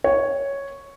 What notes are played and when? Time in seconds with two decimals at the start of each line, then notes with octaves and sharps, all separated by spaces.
0.04 C#5